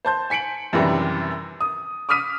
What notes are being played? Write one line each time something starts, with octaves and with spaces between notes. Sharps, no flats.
C5 A5 G6
G#5 B6 C#7 D7 F#7
F#2 C3 D#3 E3 G3
D#6
D6 D#6 F6 B6 D#7